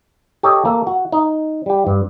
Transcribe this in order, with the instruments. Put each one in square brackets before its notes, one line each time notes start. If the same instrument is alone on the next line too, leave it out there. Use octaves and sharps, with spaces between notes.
[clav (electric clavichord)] G4 A4 C#5 D#5
A#3 A4
F#4
D#4
G3 G4
G2